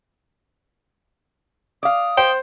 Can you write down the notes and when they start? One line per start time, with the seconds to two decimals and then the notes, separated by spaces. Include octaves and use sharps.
1.83 D5 F5 D#6
2.17 C5 G5